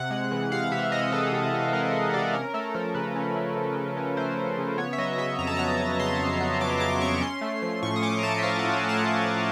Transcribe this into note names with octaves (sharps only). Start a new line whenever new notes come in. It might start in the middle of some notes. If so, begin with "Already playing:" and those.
Already playing: C3 F#5
G#3
E3
C3 F5
C3 E5
G#3 D#5
E3 A4
C3
C3
G#3 A#4
E3
C3 D5
C#4 A#4
A3 A4
F3 A#4
C#3 B4
C#4
A3
F3
C#3
C#4
A3 C5
F3
C#3
B3 C#5
E5
F#3 D#5
D#5
C#3 E5
F2 A#5
A5
B3 A#5
F#3
C#3 C6
F2
B3
F#3 D6
C#3 D6
F2 C#6
C#4 C6
A3
F3
A2 C#6
D#6
C#4 D6
A#5
A3 A5
E5
F3 F5
A2 F#5
G#5
C#4 A5
A3
F3